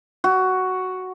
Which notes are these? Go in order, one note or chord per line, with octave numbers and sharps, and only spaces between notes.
F#4